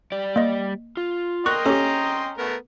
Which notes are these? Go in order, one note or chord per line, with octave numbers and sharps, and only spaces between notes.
G3 D5
A#3 D#5
F4
A#4 D#5 G5 C6 C#6 F#6
C#4 G4 A4 A#5
A3 B3 A#4